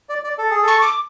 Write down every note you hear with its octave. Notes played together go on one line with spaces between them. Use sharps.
D5
D5
A4
G#4
A4
C#6
D6